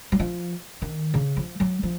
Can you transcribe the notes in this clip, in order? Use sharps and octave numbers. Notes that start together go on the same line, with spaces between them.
F#3
F3
D#3
C#3
F3
F#3
F3